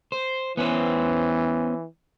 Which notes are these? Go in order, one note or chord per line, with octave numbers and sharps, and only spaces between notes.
C5
E3 B3 C#4 C5